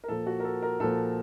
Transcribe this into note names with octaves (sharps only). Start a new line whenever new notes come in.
A#4
A#2 F3 A4
F#4
A#4
A4
A#4
A#2 F3 A4